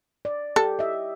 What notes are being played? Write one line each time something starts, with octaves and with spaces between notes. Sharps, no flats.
D5
G4 A4
D#5 E5